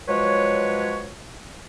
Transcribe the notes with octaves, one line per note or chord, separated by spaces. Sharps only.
F3 F#3 G#3 B4 C#5